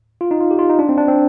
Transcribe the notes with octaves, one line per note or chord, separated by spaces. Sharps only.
F4
D#4
F4
G4
F4
D#4
D4
C4
D4
C4